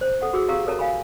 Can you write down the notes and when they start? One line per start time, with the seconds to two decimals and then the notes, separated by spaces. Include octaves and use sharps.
0.01 C5
0.22 A4 F#5
0.33 F#4 G#4 E6
0.48 G4 G#4 F5 A#5 E6
0.66 A4 A#4 C#5 A5 A#5
0.79 F5 G#5 B5